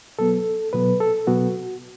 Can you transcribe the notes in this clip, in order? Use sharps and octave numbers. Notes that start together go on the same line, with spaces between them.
B2 F#3 B3 A4
B2 F#3 B3 B4
A4
B2 F#3 B3 F#4